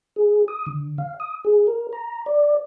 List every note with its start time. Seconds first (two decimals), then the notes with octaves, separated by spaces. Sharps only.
0.16 G#4
0.48 D#6
0.66 D3
0.98 F5
1.20 D#6
1.45 G#4
1.67 A#4
1.93 A#5
2.26 D5